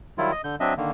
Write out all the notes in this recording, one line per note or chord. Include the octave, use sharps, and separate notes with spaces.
D#3 F#3 G3 E4 F4
D#5
D3 G6
F#3 C4 D4 D#5 E5
D3 D#3 A#3